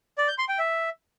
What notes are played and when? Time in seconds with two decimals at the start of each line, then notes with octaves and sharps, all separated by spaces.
0.18 D5
0.28 G6
0.38 C6
0.49 G5
0.59 E5